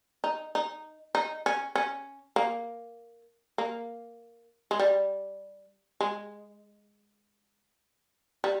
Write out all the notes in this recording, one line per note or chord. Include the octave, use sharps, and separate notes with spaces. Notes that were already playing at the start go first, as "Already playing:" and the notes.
D#4
D#4
D#4
C#4
C#4
A#3
A#3
G#3
G3
G#3
G3